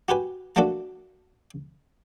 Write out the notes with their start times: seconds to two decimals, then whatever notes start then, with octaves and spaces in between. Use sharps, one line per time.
0.09 F#4 G4 B4 G#5
0.56 A3 A#3 D4 F#4 A4